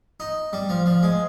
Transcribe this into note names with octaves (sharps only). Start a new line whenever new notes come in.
D#4
G3
F3
F3
G#3